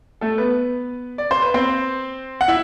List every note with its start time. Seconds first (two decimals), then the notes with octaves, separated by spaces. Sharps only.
0.21 A3 A4
0.38 B3 B4
1.18 D5
1.31 C5
1.42 B4
1.54 C4 C5
2.41 F#5
2.48 E4 E5